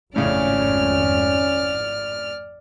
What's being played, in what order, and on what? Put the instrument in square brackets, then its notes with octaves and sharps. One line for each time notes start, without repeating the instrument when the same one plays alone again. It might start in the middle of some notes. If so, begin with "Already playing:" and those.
[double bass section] G#1 F2 [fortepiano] A2 C#3 [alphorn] C#4 [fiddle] D5 F6